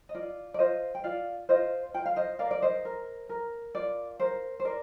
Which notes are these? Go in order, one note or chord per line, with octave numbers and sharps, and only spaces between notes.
D#5
F4 D5
D5
F4 C5 D#5
G5
F4 D5 F5
F4 C5 D#5
F4 G5
F5
C5 D#5
A#4 D5 F5
D5
C5 D#5
A#4
A#4
F4 D5
A#4 C5
C5
A#4 D5